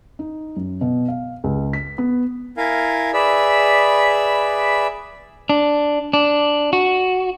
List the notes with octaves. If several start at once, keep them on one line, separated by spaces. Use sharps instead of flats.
D#4
F#2
B2
F5
C#2
B6
B3
E4 A#4 F5 G#5
G#4 B4 D5 E5 B5 E6
D4
D4
F#4